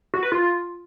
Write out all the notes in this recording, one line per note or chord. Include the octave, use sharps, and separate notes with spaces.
F#4
B4
F4